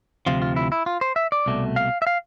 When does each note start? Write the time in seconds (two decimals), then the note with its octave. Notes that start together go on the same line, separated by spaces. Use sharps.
0.27 D2 C3 F3 F4
0.42 F4
0.56 E4
0.72 E4
0.86 F4
1.01 C5
1.16 E5
1.32 D5
1.46 C2 B2 A3
1.76 F5
2.02 E5
2.07 F5